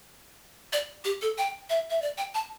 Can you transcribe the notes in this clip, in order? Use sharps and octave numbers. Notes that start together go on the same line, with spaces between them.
D5
G4
A4
G5
E5
E5
D5
G5
A5